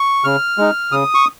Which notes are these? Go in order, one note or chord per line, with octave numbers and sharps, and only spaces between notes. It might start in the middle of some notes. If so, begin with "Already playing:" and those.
Already playing: C#6
C#3 F6
G#3 D#4
C#3 D#6
C#6